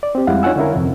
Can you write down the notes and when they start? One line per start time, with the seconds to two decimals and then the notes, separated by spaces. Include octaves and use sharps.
0.03 D5
0.15 C4 G4
0.27 F2 G3 G#3 E4 F5 F#5
0.43 C#4 D#4 F4 F#5 G#5 E6
0.56 D3 C#4 E4 A#4
0.74 F2 C3 F3